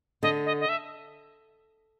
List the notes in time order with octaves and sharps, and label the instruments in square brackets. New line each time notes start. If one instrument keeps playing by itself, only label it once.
[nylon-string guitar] D3 [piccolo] D#5
[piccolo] D#5
D#5
E5